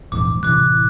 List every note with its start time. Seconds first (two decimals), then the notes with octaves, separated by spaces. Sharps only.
0.12 A#1 E2 G#2 D6
0.43 A2 C3 E3 D6 F#6